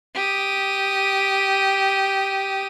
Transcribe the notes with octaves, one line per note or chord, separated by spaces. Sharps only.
G4 D#6